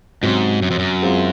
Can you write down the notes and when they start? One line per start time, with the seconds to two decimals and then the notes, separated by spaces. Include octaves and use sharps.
0.23 G#2 C3 F#3 C#4
0.62 F#2
0.71 F2
0.79 F#2
1.02 G#3 C4 F4